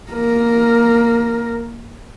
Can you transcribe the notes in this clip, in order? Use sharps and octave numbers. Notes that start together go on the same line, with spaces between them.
A#3 A#4